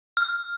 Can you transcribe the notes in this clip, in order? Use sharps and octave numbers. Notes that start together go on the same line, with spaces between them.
F6